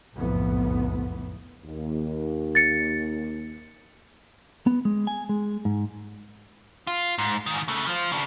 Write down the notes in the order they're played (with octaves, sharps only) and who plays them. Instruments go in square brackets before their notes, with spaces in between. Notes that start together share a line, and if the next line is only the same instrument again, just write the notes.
[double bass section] F#1 B1 F2 A2 B3
[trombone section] D#2
[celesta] A6 C#7
[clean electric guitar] B3
G#3
G#5
G#3
G#2
[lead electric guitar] F4
G#2
G#2 D#3
C#3 A3
F3 F4
C#3 D4